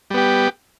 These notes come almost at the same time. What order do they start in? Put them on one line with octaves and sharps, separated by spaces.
G3 B3 G4